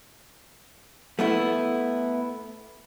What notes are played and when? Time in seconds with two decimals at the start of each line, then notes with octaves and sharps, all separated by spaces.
1.19 A3 B3 E4